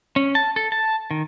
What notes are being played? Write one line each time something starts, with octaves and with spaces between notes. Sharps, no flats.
C#4
A5
A4
A5
D#3